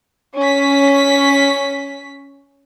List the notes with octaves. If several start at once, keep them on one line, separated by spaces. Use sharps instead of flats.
C#4 B6